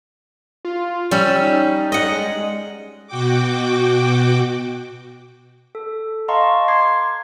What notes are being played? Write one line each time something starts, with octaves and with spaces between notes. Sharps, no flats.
F4
G3 C#4 E6
D#4
D#5 F#5
G#3
B2 F#4 G5 D6
A4
D#5 F5 A5 A#5 C6 C#6
C6 D6 G#6 C7